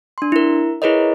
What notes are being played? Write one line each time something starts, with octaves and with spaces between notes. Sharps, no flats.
D4 C6
E4 A#4
E4 G#4 A#4 B4 C#5 D#5